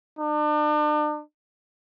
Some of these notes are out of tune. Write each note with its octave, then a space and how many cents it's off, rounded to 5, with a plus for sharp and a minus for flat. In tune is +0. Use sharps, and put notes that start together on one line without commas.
D4 +40